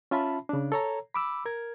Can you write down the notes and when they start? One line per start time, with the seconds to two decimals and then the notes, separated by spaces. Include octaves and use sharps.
0.11 C#4 F4 E5 A5 B5
0.49 C#3 D4
0.72 A4 C#5 A#5
1.14 B5 D6 E6
1.46 A#4 G#6